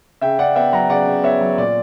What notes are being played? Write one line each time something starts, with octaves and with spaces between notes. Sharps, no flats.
C#3 E5 G5
C#3 D5 F#5
B3 E5 G5
F#3 F#5 A#5
C#3 D5 F#5
C#3
B3 C#5 E5
F#3
A#2 D5